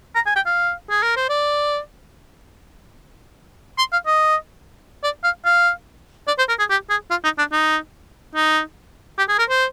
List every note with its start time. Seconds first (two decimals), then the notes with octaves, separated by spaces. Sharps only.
0.15 A#5
0.26 G#5
0.36 G5
0.47 F5
0.90 G#4
1.03 A#4
1.17 C5
1.29 D5
3.78 C6
3.93 F5
4.07 D#5
5.03 D5
5.24 F5
5.45 F5
6.28 D5
6.38 C5
6.49 A#4
6.59 G#4
6.70 G4
6.90 G#4
7.11 F4
7.24 D#4
7.39 D4
7.52 D#4
8.36 D#4
9.18 G4
9.29 G#4
9.39 A#4
9.50 C5